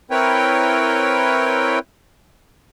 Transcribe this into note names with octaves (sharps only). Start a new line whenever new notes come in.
C4 E4 A#4 B4 C#5 G5